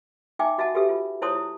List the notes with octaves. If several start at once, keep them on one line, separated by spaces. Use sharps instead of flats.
D#4 E5 G5 G#5 D6
F#4 D#5 E5 F#5 A5
F#4 G4 A4 B4 E5
F4
E4 C5 C#5 A5 C6 D#6
E4